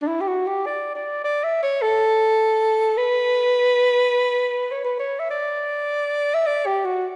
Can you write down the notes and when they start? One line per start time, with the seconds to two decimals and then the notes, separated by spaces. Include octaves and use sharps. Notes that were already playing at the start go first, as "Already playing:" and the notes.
0.02 D4
0.07 E4
0.21 G4
0.27 F#4
0.47 G4
0.66 D5
0.95 D5
1.24 D5
1.44 E5
1.63 C#5
1.82 A4
2.97 B4
4.71 C#5
4.85 B4
4.99 C#5
5.19 E5
5.31 D5
6.34 E5
6.47 D5
6.66 G4
6.85 F#4